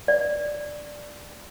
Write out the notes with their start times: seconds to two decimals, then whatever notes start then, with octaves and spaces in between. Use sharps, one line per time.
0.08 D5